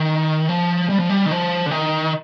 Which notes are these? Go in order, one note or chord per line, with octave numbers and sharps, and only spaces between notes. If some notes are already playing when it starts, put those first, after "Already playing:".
Already playing: D#3
F3
G3
F3
G3
D#3
F3
D3
D#3